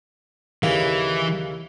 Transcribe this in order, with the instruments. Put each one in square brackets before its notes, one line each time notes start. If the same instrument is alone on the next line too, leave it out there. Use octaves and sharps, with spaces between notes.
[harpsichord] D#2 C#3 [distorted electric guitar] E3